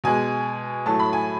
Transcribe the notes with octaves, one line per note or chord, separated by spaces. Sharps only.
B2 G#3 G#5
A2 F#3 A3 A5
B5
G#5